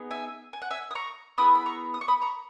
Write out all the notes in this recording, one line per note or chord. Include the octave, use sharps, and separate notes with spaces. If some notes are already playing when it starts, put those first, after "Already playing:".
Already playing: B3 D#4 G#4
E5 G#5
G#5
F#5
E5 G#5
D#6
A#5 C#6
B3 E4 G#4 B5 D#6
B5
A#5 C#6
D#6
C#6
B5 D#6
A#5 C#6